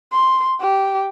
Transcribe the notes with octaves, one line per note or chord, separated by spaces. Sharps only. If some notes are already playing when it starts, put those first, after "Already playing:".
C6
G4